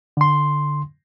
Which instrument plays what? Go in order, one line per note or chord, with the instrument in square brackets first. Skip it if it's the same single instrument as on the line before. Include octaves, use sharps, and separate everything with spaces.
[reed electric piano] D3 C6